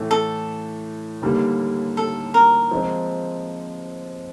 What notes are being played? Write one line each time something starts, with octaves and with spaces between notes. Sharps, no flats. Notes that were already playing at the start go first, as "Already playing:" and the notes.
Already playing: A2 E3 A3
A4
D#2 D3 G3 A#3
A4
A#4
F3 G#3 C4